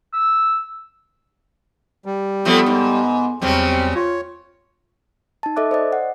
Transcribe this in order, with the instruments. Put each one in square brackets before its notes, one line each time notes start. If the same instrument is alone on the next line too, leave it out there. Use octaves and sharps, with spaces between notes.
[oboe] E6
[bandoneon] G3
[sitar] F3 A3 C4 [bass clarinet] B3
[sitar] G#2
[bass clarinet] E2 [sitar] C#3 F#3 G3 [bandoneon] C4
[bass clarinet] F4 [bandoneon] C#5
[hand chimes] D#4 A5
A4 D#5 E5 D6 F#6
C5 D5 D#5
F#5